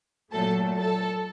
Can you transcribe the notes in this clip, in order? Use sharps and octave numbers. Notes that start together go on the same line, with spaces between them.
A#2 F#3 A3 A4 A5
A4 A5